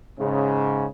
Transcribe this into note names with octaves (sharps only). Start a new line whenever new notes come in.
G#2 C#3